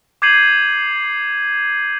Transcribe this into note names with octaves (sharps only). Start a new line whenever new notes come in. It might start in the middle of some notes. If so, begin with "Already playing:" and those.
D6 G6 G#6 C7 D#7 F#7